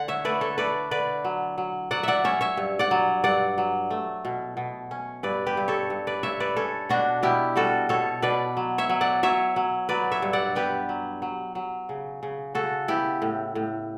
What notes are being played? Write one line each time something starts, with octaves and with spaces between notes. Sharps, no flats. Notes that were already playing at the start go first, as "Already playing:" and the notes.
Already playing: D3 F#5
C#5 E5
A3 B4 D5
A4 C#5
A3 B4 D5
D3 B4 D5
F#3
F#3
F#3 D5 F#5
D5 E5 F#5
C#4 C#5 E5
C#5 E5
G2
D5 F#5
F#3
G2 D5 F#5
F#3
A3
B2
B2
C#4
G2 B4 D5
G4 B4
G2
A4 C#5
G2
B4 D5
G2 C#5 E5
B4 D5
C#4 A4 C#5
B2 D4 F#4
B2 E4 G4
G3 F#4 A4
B2 A4 C#5
B2 B4 D5
F#3
C#5 E5
F#3
D5 F#5
F#3 C#5 E5
F#3
F#3 B4 D5
C#5 E5
G2
D5 F#5
B3 G4 B4
F#3
F#3
F#3
C#3
C#3
C#3 F#4 A4
B3 E4 G4
A2
A2